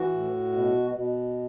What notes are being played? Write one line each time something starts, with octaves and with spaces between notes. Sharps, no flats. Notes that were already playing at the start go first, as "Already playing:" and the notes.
Already playing: E3 F#4
A2
B2
B2